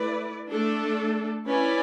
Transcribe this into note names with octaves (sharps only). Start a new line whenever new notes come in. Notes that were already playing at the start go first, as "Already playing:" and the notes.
Already playing: A3 E4 B4 D5
A3 D4 A4
C#4 E4 B4 D5